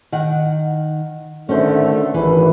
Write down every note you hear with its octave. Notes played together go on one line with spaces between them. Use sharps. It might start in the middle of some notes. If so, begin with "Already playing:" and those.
D#3 F#5
D3 D#3 A3 C#4 F#4 C5
G#1 E3 B4